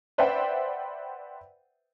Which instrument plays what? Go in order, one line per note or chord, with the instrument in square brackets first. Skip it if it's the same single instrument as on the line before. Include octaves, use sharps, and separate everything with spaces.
[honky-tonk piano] B4 C5 D5 E5 F#5 G5